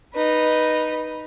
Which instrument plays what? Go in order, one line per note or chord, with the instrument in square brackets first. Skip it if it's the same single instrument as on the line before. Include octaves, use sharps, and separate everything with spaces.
[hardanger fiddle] D#4 B4